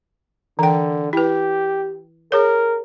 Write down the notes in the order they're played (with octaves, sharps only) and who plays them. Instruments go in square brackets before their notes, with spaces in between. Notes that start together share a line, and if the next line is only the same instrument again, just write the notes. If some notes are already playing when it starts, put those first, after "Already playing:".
[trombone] D3 [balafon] E3 G5
[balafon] E4 B4 [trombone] G4
[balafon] G#4 C#5 [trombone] A#4